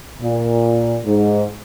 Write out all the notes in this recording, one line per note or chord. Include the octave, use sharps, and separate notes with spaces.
A#2
G#2